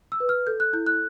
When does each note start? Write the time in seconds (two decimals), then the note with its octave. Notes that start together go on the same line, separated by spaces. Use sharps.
0.12 E6
0.20 B4
0.29 F6
0.47 A4 G6
0.60 F#6
0.73 E4 G6
0.86 F#6